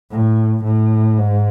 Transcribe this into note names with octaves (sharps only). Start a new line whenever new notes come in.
A2
A2
G#2